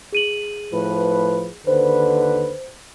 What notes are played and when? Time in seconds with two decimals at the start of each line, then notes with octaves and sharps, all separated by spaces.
0.12 G#4 D#7 F#7
0.73 A2 F3 B4
1.67 D#2 D3 B4 C5